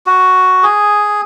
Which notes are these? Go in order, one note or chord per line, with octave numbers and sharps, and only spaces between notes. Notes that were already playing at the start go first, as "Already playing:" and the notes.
F#4
G#4